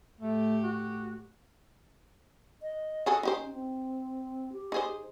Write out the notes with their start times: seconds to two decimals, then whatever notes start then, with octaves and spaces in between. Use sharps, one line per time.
0.21 A2 A3 G4
0.63 F#4
2.62 D#5
3.06 F#4 G#4 A4
3.23 C#4 D#4 G4 C5
3.54 C4
4.53 G4
4.72 D#4 G#4 C5